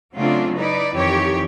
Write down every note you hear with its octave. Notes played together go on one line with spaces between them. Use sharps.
C#3 F#3 A3 C4 D4 F4
D#4 E4 B4 D5
F2 D#3 E3 G4 C#5